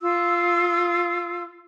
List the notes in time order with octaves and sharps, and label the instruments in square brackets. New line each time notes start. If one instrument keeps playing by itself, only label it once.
[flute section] F4 E6